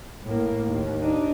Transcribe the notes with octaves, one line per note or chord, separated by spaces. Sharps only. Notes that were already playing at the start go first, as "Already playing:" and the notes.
A2 A#3
D#2
D4 D#4